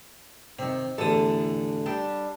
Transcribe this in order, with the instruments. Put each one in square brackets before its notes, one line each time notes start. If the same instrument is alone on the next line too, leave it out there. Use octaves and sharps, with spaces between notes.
[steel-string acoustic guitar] C3 D#3 [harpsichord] C4
[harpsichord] A1 E2 D#6 [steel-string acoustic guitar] D3 E3 A5 [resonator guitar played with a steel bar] A4
[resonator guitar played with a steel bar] G3 D4